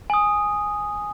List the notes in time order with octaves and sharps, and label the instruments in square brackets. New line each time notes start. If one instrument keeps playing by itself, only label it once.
[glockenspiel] G#5 D#6